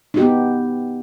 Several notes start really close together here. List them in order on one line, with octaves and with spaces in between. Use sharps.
D#4 G4 B3